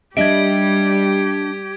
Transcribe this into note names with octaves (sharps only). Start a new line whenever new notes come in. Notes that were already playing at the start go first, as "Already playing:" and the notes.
G3 D4 G4 D#5 E5 G#6 D7